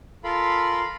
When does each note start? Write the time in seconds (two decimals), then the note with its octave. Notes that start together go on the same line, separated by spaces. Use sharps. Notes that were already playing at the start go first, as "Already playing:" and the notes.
0.24 F4 A4 A#4 F5 B5 C6